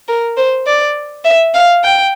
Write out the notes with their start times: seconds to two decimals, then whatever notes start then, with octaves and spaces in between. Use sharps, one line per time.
0.08 A#4
0.37 C5
0.67 D5
1.25 E5
1.54 F5
1.84 G5